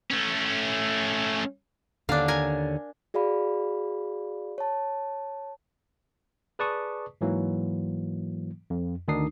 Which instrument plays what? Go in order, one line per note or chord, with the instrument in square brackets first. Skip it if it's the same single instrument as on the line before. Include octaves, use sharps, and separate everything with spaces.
[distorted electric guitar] A3 C#4
[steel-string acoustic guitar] D#2 D3 C#4 [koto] D4 F5
[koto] A#4 G#5
[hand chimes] F#4 G#4 D5 F5 B5
C#5 A5
[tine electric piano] G#4 B4 D5 A5 C#6 D#6
G#2 E3 F#3 A#3
F2
D2 D#3 D4 D#4 D#6 C7